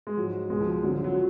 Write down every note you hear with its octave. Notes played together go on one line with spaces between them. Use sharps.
G#3
G#2 F3 F#3
C#2 B2 G#3
F3
F#2 D3 F3 F#3
F#3
F#3